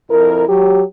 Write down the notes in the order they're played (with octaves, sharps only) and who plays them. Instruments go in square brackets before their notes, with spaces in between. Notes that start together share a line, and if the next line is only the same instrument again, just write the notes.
[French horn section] F2 E4 A#4
F#3 G4